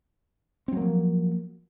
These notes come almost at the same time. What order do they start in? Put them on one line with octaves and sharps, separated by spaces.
C4 F#3 A#3 F3